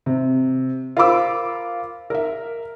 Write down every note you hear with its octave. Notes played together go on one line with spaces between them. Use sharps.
C3
F4 A#4 C5 B5 D6 E6
A#4 E5